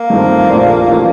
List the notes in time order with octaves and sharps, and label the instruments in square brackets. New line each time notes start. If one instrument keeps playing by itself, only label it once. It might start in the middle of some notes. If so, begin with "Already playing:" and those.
Already playing: [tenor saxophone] A#3
[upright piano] G2 D#3 A3 C4 F4
A#1 A#2 A3 D4 F4
A1 F3 A3